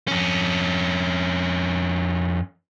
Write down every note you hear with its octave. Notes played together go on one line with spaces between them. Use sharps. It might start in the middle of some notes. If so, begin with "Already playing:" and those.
F2 C#4